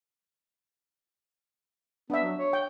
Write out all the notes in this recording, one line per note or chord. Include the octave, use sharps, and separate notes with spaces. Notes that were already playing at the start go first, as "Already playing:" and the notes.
B3 D4 E5
F#3
C#5
G5